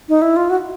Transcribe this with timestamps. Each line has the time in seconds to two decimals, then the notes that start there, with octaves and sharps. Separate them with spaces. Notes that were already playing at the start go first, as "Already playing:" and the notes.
0.09 D#4
0.22 E4
0.36 F4
0.50 F#4